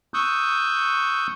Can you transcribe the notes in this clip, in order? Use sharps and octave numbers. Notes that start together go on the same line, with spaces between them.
C#6 D#6 E6 F#6 G6